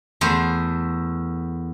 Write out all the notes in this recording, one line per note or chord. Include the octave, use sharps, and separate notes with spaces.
E2 A3 C5